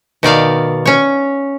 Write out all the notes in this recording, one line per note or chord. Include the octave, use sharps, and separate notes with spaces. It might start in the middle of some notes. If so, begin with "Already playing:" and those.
B2 D#3 D5 F5
C#4 C#5